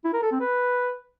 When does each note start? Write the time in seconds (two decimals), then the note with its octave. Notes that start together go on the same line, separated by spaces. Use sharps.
0.04 E4
0.13 A#4
0.22 A4
0.31 C4
0.41 B4